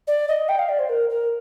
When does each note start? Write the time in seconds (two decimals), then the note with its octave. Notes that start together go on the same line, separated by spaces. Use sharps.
0.07 D5
0.28 D#5
0.49 G5
0.59 F5
0.69 D5
0.79 C5
0.89 A#4
1.09 A#4